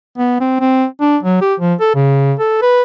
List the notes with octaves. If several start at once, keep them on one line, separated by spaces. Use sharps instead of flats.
B3
C4
C4
D4
F#3
G4
F3
A4
C#3
A4
B4